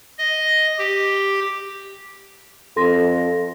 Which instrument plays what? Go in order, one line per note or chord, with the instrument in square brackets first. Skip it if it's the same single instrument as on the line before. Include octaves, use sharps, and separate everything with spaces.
[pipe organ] D#5
G4
[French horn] F2 [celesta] A4 C6 A#6